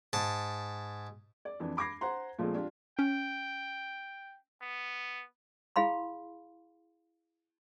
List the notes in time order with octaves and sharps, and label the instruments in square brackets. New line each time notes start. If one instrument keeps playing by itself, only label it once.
[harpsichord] G#2 A5
[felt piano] D5
F2 E3 D4
B5 D6 G#6 A#6 C7
C5 F#5 A#5 C6
A#2 F3 G#3 A3 C4
D4 F4 G4
[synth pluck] C#4 [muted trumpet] G5
[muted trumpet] B3
[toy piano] E4 G#4 F5 B5 C6